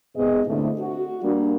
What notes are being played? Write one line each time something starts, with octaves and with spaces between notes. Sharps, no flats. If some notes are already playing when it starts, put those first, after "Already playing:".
G#2 C3 B3 G#4 D#5
D3 A3 C4 E4
F#4
G3 A#3 D4